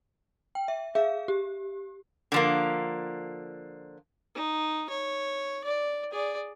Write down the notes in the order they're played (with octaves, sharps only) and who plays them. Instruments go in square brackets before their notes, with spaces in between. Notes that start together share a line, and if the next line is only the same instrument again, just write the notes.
[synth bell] G5
E5
[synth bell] G#4 F5 [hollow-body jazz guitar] E5
[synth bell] G4
[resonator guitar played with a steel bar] D3 F3 A#3
[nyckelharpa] D#4
C#5
D5
G#4 D5